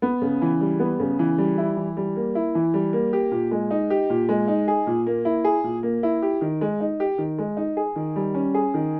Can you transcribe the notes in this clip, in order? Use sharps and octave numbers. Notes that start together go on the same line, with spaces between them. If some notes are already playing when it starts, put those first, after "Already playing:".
B3
C#3
E3
G3
B3
C#3
E3
G3
E4
E3
G3
A#3
E4
E3
G3
A#3
G4
A#2
G#3
D#4
G4
A#2
G#3
D#4
G#4
A#2
A#3
E4
G#4
A#2
A#3
E4
G4
D#3
G#3
D#4
G4
D#3
G#3
D#4
G#4
D#3
G3
C#4
G#4
D#3